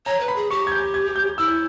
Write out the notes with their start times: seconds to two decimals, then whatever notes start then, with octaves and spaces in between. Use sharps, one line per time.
0.06 C#5 A#5
0.20 B4
0.28 B5
0.36 G#4
0.50 G4 C#6
0.67 G#6
0.72 G6
0.94 G#6
1.16 G6
1.38 E4 E6